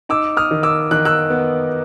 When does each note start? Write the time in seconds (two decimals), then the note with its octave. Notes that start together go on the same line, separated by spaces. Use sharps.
0.09 D#4 D6 E6
0.37 D#6 F6
0.51 D#3
0.63 D6 E6
0.91 D#3 F#6
1.05 E6 F#6
1.30 B3